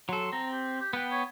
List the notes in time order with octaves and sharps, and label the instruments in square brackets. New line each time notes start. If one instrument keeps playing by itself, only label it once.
[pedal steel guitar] F#3 A4 [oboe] C6
[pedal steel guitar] C4 [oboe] A#5
[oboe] G4
G4
[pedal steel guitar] B3 G5 [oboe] B4
[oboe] C#5